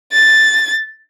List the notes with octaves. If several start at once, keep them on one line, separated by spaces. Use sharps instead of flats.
A6